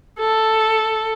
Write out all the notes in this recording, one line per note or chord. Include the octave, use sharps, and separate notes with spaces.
A4